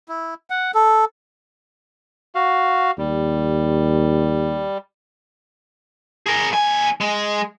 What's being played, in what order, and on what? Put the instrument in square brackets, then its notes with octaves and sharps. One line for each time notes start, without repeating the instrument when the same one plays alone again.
[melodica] E4
F#5
A4
[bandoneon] F#4 F5
[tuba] D#2 [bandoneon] G3
[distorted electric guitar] G#4 A#4
D#2 G#5
G#3